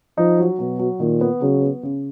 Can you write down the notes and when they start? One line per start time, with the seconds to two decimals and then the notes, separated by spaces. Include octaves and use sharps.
0.18 F3 D#4
0.39 F#3
0.59 B2 F#3
0.79 F#3
1.00 A#2 D#3
1.21 B3
1.42 C#3 F#3
1.62 B3
1.83 C#3